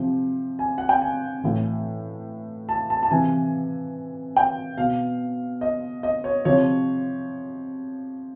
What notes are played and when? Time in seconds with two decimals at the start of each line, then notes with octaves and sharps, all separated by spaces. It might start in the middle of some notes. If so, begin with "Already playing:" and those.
Already playing: C3 F3
0.59 G#5
0.78 F#5
0.89 G5
1.02 G#5
1.43 A2 E3
2.69 A5
2.90 A5
3.03 A5
3.11 C3 E3 G#5
4.37 G5
4.78 B2 F5
5.61 D#5
6.03 D#5
6.24 C#5
6.45 C3 F3 C#5